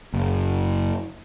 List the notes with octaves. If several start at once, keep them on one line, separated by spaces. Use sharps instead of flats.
F#1